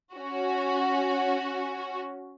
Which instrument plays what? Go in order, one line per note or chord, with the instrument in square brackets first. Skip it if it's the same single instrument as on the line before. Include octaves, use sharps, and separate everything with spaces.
[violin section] C#4 F#4